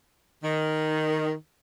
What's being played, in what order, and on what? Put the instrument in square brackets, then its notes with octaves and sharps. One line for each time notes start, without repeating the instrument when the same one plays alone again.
[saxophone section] D#3